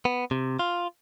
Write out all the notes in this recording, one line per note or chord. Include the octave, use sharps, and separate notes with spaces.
B3
C3
F4